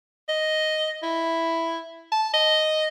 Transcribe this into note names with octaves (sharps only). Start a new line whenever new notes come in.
D#5
E4
A5
D#5